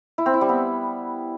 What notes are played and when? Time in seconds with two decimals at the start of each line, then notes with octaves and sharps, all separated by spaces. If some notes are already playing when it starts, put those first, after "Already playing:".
0.18 E4
0.26 C4
0.34 E4
0.41 G3
0.49 B3